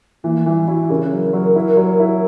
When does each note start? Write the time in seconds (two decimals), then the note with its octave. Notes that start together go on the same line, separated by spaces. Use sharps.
0.24 E3 A#3
0.46 E3 G3
0.68 E4 F#4
0.90 C#3 A#4
1.12 F#3
1.33 F#3
1.56 E4
1.77 F#3
2.00 E4